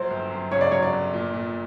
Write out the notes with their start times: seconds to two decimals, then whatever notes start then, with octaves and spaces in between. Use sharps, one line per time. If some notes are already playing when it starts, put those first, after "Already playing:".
Already playing: A#1 F#3 C5
0.10 G1
0.31 F#2
0.52 C#3 C#5
0.61 D5
0.71 F#3 C#5
0.83 D5
0.92 G1
1.14 A#2
1.34 A#2